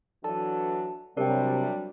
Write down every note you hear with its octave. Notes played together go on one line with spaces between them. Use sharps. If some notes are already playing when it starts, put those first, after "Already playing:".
E3 F#3 D4 A4 A5
C3 F#3 G3 D4 A#4 G5